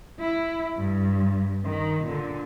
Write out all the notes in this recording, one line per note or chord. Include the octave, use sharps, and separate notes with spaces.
E4
G2
D#3
A#2 D3